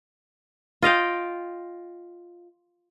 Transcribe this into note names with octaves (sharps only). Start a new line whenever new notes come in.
F4 D#5 F5 G5